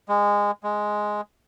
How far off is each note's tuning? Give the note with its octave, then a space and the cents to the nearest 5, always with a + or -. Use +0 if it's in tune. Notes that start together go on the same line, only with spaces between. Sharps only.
G#3 -20
G#3 +5